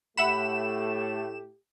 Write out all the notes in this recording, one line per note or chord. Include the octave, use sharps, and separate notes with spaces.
A2 A3 G4 E5 F#5 B5 E7